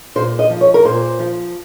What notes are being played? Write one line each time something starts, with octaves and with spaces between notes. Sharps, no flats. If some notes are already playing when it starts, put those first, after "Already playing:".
A#2 C5
D#5
F3
C#5
A#4
A#2 C5
F3